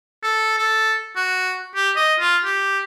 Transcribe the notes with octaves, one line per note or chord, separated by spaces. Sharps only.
A4
A4
F#4
G4
D#5
F4
G4